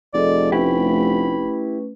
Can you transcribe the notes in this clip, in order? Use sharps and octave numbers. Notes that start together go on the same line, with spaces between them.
F1 G#4 A4 D5 D#5
A3 C#4 E4 G4 B4 B5